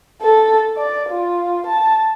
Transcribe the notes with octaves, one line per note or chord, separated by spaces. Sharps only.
A4
D5
F4
A5